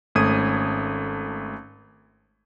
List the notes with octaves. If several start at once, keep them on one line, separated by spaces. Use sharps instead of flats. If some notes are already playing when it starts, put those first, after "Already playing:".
G#1 A3 C#4 D#6 G#6 D#7